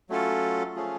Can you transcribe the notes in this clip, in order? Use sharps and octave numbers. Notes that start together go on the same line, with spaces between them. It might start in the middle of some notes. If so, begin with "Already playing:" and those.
F#3 A3 C#4 F4 A4
F3 A3 C#4 F4 G#4